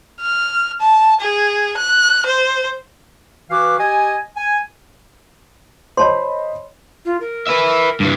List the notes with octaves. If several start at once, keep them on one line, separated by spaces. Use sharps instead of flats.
F6
A5
G#4
F#6
C5
E3 F#4 B4 F5 D6
G4 D#5 G#5
G#5
C5 C#5 D#5 A5 B5 C6
F4
A#4
B4 E5
G2 E3